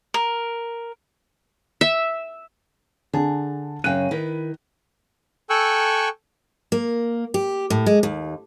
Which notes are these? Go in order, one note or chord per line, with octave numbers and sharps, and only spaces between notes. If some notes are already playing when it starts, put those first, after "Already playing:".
A#4
E5
D3 G#4 A5
F#2 C#3 G5 F#6 D#7
D#3 E4 B4
A4 G5 G#5 C#6 E6 F#6
A#3
G4
A2
G#3
D#2